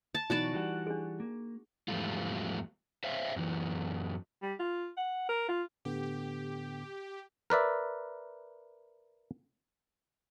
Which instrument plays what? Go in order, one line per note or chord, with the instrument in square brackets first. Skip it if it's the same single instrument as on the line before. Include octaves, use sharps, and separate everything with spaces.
[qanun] A5
[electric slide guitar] B2 E3 F#3 [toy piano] D#4 B5 [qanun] F#4 D5 A5
[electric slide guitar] E3 G3 F#5
[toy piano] D4 G#4
[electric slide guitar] A#3
E2 G#2 F3 G3 A3 F4
C5 C#5 E5 F5
F#2 E3
[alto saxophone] G3
F4
F#5
A#4
F4
[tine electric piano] A2 D3 B3 [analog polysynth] G4
[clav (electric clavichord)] A#4 B4 D5 E5